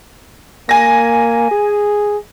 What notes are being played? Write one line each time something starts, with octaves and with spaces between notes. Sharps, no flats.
A#3 G#5 A#6
G#4